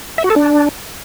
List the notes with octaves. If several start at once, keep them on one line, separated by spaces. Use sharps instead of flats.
E5
F#4
A4
D4